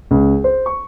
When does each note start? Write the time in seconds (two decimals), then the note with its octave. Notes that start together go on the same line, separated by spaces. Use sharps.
0.11 C#2
0.44 C5
0.66 C#6